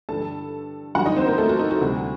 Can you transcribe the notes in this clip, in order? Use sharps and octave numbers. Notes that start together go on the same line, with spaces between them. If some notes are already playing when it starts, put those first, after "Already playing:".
G2 D3 G3 A4 A5
F#2 D3 G3 F#4 F#5
D#4 D#5
C4 C5
A#3 A#4
A3 A4
F#4
D#4
F#4
D2 C3 G3